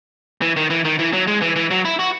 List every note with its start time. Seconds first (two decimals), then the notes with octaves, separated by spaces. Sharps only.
0.42 E3
0.57 D#3
0.70 E3
0.85 D#3
0.99 E3
1.13 F#3
1.28 G#3
1.42 E3
1.56 E3
1.71 F#3
1.85 E4
1.99 F#4